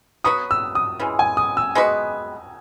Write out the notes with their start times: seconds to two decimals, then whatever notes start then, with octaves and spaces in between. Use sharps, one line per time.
0.24 F#3 B3 F#4 B4 D#6
0.51 E6
0.75 D#6
1.00 C#3 E3 G#3
1.19 G#5
1.37 D#6
1.57 E6
1.75 G#3 B3 F#4 B4